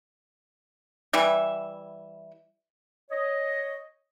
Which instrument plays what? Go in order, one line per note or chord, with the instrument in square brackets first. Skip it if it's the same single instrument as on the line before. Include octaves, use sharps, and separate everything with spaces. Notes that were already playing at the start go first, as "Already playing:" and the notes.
[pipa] E3 G3 E5
[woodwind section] C#5 D#5